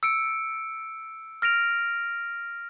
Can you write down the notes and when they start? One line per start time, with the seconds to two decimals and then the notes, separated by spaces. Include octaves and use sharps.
0.03 E6 C#7 D7
1.42 F6 A#6 D7 F7